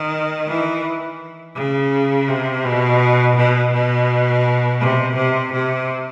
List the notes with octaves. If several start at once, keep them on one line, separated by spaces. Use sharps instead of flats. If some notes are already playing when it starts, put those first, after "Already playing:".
Already playing: D#3
E3
C#3
C3
B2
B2
B2
C3
C3
C3